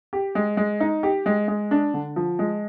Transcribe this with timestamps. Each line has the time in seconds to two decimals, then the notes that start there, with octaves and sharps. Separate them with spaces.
0.13 G4
0.35 G#3
0.57 G#3
0.80 D#4
1.03 G4
1.26 G#3
1.48 G#3
1.71 D4
1.94 D3
2.16 F3
2.39 G#3